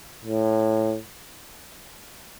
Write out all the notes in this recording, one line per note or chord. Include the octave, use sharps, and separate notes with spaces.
A2